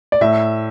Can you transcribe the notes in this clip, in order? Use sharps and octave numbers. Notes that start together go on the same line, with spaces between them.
D5
A2 E5